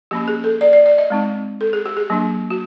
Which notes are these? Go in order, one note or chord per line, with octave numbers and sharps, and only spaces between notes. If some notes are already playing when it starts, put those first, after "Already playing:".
F3 A#3 C#4 G4
G#4
A4
D5
D5
D5
D#5
G#3 C4 D#4
A4
G#4
G4
G#4
F#3 A#3 D4
F#4